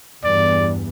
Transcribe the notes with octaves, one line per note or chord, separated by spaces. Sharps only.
E2 G2 D5